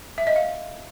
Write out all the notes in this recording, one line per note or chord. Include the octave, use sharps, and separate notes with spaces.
E5
D#5
F5